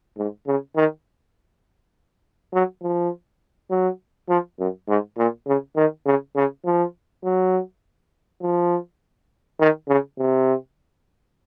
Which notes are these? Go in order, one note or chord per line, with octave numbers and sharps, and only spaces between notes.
G#2
C#3
D#3
F#3
F3
F#3
F3
F#2
G#2
A#2
C#3
D#3
C#3
C#3
F3
F#3
F3
D#3
C#3
C3